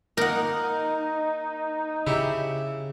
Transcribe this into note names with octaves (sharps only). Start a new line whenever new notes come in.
A#3 D#4 A#4 F#5
C#3 E4 G4